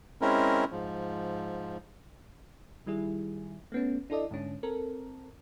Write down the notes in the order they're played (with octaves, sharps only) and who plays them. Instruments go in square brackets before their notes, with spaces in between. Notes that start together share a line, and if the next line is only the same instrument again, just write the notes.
[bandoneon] G#3 C4 C#4 E4 A#4
G#2 F3
[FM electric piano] D#3 G3 E4 G#4
A3 B3 C#4
D4 E4 A4 D5 D#5
G#2 D3 C#4 D4
C4 A4 A#4